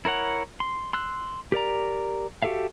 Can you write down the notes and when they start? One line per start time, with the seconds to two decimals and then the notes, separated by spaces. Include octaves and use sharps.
0.05 E4 A#4 C#5 F#5
0.60 C6
0.93 C6 E6 F#6
1.52 G4 A#4 D5 A#5
2.42 F#4 G4 A4 E5 F5